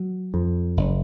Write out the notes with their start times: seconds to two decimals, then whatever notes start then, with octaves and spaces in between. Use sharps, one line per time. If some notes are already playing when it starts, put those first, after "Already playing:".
Already playing: F#3
0.34 F2
0.77 F#1